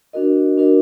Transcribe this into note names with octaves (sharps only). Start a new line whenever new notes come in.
D4 F#4 A#4 D#5
D4 F#4 A#4 D#5